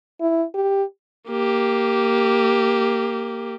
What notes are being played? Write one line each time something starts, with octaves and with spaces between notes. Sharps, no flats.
E4
G4
A#3 G4